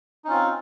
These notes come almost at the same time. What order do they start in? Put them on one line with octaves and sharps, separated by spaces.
D#4 C#4 F4 C4